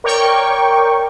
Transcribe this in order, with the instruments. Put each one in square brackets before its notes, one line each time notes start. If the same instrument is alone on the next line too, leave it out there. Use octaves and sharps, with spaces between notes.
[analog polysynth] A#4 C#5 D5 G5 C#6